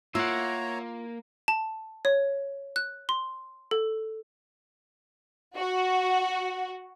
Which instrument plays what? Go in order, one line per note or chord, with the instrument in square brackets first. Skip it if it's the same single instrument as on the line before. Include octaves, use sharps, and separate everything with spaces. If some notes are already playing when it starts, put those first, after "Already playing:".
[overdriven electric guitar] A#3 [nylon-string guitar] F4 [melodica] C#5 A#5 [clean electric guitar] E5 F#5
[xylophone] A5
C#5
F#6
C6
A4
[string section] F#4